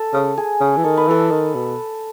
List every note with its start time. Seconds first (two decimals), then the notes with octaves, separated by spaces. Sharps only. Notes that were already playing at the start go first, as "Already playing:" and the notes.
Already playing: A4
0.13 C#3
0.37 G#4
0.61 C#3
0.77 E3
0.84 D#3 A4
0.97 B4
1.08 E3 A4
1.31 D#3
1.55 B2